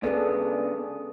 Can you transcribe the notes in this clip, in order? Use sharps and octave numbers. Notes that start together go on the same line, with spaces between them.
C#3 B3 D4 G#4 A4 D5